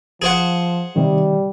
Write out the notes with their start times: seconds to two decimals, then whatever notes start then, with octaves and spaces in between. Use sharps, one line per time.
0.22 F3 G#4 C5 F#5
0.96 C3 D#3 G3